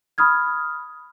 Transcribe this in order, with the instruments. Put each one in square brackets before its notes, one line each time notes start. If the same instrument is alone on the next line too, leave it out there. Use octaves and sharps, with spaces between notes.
[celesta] B5 D#6 F6 G#6